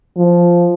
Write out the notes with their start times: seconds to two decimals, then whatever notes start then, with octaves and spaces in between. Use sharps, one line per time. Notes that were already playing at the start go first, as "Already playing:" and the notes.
0.17 F3